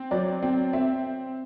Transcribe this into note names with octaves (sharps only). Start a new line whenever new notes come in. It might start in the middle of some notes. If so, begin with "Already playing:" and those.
Already playing: C4
F#3 D5
C4
C4 E5